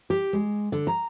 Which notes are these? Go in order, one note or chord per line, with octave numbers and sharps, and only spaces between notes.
G4
G#3
D3
A#5